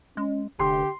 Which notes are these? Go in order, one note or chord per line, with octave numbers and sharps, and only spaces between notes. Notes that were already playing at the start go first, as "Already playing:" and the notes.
G#3 C#4
F1 D3 G4 C6